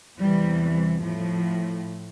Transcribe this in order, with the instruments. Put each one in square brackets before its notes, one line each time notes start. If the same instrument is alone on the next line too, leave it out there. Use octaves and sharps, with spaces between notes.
[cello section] E2 C3 E3 G3
A2 F3